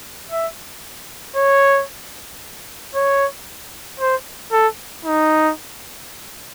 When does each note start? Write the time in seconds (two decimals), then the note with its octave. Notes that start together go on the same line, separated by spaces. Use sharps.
0.32 E5
1.36 C#5
2.95 C#5
4.00 C5
4.52 A4
5.05 D#4